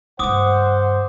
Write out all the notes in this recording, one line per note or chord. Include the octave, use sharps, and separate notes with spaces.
G2 C#3 C5 F#5 D6 D#6